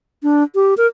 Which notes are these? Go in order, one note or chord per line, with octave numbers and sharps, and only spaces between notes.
D4
G4
A#4